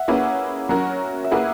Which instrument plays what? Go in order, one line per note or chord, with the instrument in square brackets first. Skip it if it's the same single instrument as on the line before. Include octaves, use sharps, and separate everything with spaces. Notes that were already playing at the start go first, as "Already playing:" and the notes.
Already playing: [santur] E5 F#5
[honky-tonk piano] A#3 C#4 E4 G#4 B4
F#3 C#4 F#4 A#4
[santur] E5
[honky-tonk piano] A#3 E4 G#4 B4 [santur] F#5